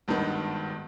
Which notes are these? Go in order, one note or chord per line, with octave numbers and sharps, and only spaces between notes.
G#1 G2 D#3 B3